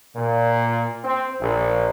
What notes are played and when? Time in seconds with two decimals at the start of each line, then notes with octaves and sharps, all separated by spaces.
0.16 A#2
1.04 C4
1.40 A#1